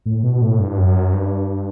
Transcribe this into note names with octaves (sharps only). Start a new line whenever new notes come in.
A2
B2
A2
G2
F#2
G2